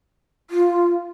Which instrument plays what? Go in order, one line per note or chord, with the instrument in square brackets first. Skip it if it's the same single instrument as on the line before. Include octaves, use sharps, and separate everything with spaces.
[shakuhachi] F4